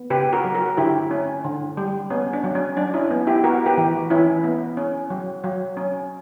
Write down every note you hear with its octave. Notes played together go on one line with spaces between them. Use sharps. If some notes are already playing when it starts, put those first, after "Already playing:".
Already playing: B3
C#3 G4 B4
F#4 A#4
F#3
F#4 A#4
D3 E4 G4
C#4
D3
G3
B3 C#4
D4
F#3
C#4
F#3 D4
C#4 E4
B3
E4 G4
B3 F#4 A#4
G4 B4
E3
E3 C#4 E4
B3
C#4
F#3
F#3
C#4